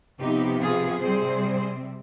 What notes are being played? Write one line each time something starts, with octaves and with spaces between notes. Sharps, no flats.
C3 F3 B3 D#4 G4
F4 G#4
C3 G3 C4 G#4 C5